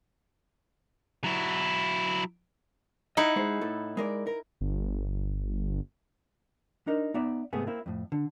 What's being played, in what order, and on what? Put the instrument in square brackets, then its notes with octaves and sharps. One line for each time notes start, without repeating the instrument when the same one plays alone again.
[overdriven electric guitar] F#3 E4
[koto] D#4 E4 F#5 [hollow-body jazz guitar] D#5
[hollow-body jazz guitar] G#3 G#4 C5
A2 A4
G#3 A#4 D5
A#4
[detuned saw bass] G1
[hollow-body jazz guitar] D4 D#4 A#4
B3 D#4 D5 E5
G#2 C3 A3 B3 G#4
A#3 C4 E4
F2 A2
D3